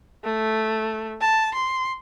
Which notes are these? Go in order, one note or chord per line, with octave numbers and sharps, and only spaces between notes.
A3
A5
C6